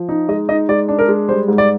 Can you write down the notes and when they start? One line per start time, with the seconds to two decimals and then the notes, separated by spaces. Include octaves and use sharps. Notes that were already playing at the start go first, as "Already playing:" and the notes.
Already playing: F3
0.09 D#4
0.29 G#3 D#5
0.48 D#4 D#5
0.69 G#3 D5
0.88 D4
0.99 A#4
1.08 G#3
1.29 G3 C5
1.48 G#2
1.58 D5